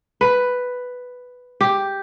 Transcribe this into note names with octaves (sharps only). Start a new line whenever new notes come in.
B4
G4